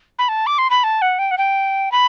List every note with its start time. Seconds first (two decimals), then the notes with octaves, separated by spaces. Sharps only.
0.19 B5
0.29 A5
0.47 D6
0.58 C6
0.70 B5
0.84 A5
1.02 F#5
1.19 G5
1.31 F#5
1.38 G5
1.92 B5